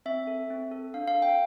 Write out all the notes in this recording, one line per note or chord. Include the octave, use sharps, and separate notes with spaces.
C4 E5
A4
C4
A4
D4 F5
F5
A4
G5